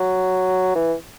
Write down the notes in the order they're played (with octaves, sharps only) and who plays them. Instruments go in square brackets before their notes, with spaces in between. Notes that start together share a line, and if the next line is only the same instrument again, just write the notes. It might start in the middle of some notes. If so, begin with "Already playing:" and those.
Already playing: [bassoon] F#3
E3